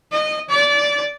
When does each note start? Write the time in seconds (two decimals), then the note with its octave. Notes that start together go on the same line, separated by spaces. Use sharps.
0.11 D#5
0.49 D5